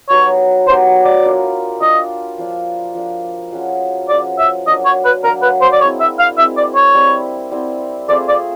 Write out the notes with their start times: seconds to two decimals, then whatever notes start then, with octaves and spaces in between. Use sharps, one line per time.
0.09 F#3 B3 D#4 G4 C#5
0.66 F#3 B3 D#4 G4 C5
1.04 D5
1.24 D4 F4 A#4
1.81 D4 F4 A#4 D#5
2.38 F3 A#3 D4
2.95 F3 A#3 D4
3.52 F3 G#3 C#4 F#4
4.09 F3 G#3 C#4 F#4 D5
4.38 E5
4.67 F#3 A#3 D4 D#5
4.85 C#5
5.05 B4
5.23 F#3 A#3 D4 A#4
5.42 B4
5.61 C5
5.72 D5
5.81 G#3 C4 E4 C#5
6.00 E5
6.19 F5
6.37 G#3 C4 E4 E5
6.57 D5
6.75 C#5
6.95 G3 C4 E4
7.52 G3 C4 E4
8.08 A3 C4 F4 G#4 D5
8.28 D5